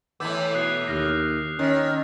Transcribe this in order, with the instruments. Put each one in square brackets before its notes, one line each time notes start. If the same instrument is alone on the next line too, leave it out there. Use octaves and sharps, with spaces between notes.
[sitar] A2 E3 B3 [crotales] D6 E6 G6
[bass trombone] B2 [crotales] D#6 F#6 C7
[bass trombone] D#2 [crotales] D#6 F6 A#6
[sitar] D#3 [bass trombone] C#4